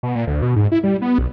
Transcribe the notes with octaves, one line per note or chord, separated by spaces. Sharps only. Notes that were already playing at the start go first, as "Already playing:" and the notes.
B2
A#2
D2
B2
G#2
E4
G3
B3
B1